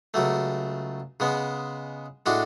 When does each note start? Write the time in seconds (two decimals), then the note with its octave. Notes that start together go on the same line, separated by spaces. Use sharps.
0.14 C#2 C#3 F#3 A3
1.20 C#3 G#3 B3
2.26 A2 G#3 D4 F#4